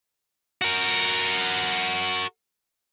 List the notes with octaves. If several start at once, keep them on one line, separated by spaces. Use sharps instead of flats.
F#4 A#4